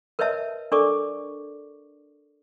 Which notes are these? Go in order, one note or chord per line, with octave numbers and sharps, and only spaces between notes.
A#4 B4 C#5 D#5 E5 A5
D4 A4 A#4 D5 C#6 D6